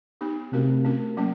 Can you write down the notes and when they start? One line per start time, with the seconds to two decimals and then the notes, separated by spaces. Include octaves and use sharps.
0.21 B3 D#4 G4
0.52 C3 A3 C#4 F#4 A#4
0.85 A3 C#4 F#4 A#4
1.17 F#3 A#3 C#4